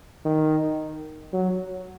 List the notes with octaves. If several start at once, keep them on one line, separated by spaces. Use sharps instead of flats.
D#3
F#3